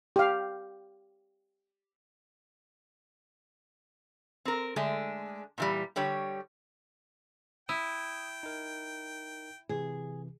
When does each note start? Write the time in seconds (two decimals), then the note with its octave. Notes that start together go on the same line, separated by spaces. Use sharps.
0.16 G4 F5
4.45 C4 A#4
4.76 D3 G#3 A3 D4
5.58 A#2 E3 G3
5.96 D3 G3 G4 C#5
7.69 E4 G5 D#6
8.43 D#4 A#4
9.69 C3 E3 G#4